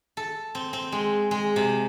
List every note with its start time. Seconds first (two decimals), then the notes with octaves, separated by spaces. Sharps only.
0.17 A4
0.55 C4
0.73 C4
0.92 G#3
1.31 G#3
1.56 C3